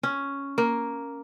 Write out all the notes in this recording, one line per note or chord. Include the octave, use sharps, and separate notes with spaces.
C#4
A#3